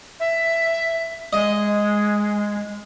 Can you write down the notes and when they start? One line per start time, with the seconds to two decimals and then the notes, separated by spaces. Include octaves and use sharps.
0.20 E5
1.33 G#3 D#5